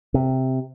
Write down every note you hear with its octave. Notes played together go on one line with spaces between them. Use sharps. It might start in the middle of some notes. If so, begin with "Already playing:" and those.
C3